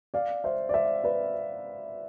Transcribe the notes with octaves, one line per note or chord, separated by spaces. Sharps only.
D5 F5
C5 E5
D5
C5 E5
B4 D5